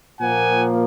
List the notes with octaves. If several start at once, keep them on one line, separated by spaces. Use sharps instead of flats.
A#2 F3 A#3 F#5 G#5